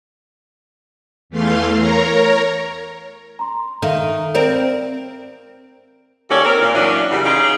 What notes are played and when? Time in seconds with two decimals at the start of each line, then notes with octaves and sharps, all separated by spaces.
1.30 E2 E3 A3 F5 C6
1.78 A#4 C#5 A#5
3.39 A#5 C6
3.82 D#3 A4 E5 F5
4.34 C4 A#4 D5 D7
6.30 D#2 C#4 F#4 A4 C#5 D5
6.45 C4 A#4
6.62 A#2
6.75 E3 F#3 A#3 C#4 D4
7.11 F#2 C#3 E3 G3
7.24 C#4 D#4 F4 G4 G#4